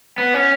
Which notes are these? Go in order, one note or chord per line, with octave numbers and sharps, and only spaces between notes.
B3
C#4